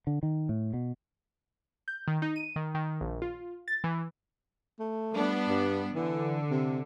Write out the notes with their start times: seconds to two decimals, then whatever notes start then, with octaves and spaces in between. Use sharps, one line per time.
0.07 D3
0.23 D#3
0.49 A2
0.74 B2
1.88 G6
2.08 D#3
2.22 D#4
2.36 D#7
2.56 D#3
2.74 D#3
3.01 A#1
3.22 F4
3.68 A6
3.84 E3
4.80 A3
5.13 G3 B3 D4
5.49 G2
5.95 D3 E3
6.50 C3